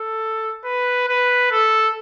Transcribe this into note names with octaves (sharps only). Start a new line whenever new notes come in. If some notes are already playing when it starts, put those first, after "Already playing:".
Already playing: A4
B4
B4
A4